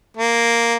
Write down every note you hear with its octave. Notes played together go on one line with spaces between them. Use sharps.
A#3